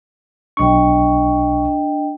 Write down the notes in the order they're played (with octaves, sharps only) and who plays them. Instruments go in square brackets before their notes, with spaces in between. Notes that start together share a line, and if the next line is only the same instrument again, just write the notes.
[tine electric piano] B1 C#6 [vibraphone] D4 D#5 G5